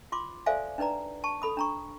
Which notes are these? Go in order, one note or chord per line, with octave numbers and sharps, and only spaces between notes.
F4 C6 D6
A4 C5 D5 E5 F5 G#5
D4 D#4 B4 D5 A#5
A5 C#6
A4 B5 D#6
D4 A#5 C#6